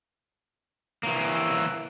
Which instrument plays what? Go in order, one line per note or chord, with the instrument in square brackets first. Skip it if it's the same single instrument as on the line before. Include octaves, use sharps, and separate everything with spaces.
[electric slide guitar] E3 A#3